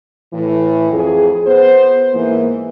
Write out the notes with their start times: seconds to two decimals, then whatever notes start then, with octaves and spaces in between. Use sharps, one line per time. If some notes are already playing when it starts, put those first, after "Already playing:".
0.32 A2 E3
0.92 F2 G#4
1.46 B3 C5
2.12 G#2 E3 A#3